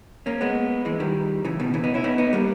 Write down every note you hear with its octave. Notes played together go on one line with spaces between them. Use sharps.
A#3 C#4
G#3 B3
E3 G#3
D#3 G3
C#3 E3
B2 D#3
C#3 E3
B3 D#4
C#4 E4
B3 D#4
B3 D#4
G3 A#3